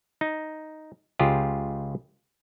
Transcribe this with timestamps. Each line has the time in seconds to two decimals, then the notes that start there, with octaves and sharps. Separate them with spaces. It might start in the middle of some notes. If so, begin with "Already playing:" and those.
0.21 D#4
1.19 C#2 F4 G4 G#4